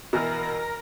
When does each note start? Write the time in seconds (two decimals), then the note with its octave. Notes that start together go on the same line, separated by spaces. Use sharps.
0.13 B2 E3 A#4 F6 A#6